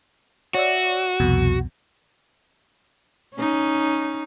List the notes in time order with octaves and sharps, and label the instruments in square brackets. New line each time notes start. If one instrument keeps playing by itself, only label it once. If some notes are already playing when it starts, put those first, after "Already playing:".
[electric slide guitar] F#4 [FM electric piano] C#5 D5 E5
[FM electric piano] C2 F2 B2
[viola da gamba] C#4 D#4